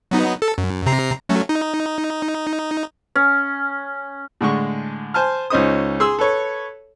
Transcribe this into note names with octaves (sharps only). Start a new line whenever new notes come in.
F#3 B3 D#4
A4
F#2
C3 A#5 C7
F#3 A3 C#4
D#4
C#4
A2 D3 G#3 C#6
C5 G#5 A5 F6
C#2 C#4 D#4 C5 D#6
G#4 C6 E6
A4 B4 C#5